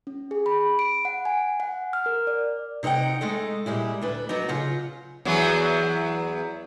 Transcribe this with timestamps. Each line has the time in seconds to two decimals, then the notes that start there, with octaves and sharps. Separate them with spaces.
0.07 C#4
0.31 G#4
0.46 B5
0.79 D7
1.05 F#5
1.25 G#5
1.60 F#5
1.93 F6
2.06 A#4
2.27 D5
2.83 C3 D#4 B4 F#5 G5
3.21 G#3 A3 D#4
3.66 A#2 G3 G#3 E4
4.01 D2 D4 B4
4.29 F#3 B3 D4 D#4
4.48 C#3 F4 F#5
5.25 E2 F#3 B3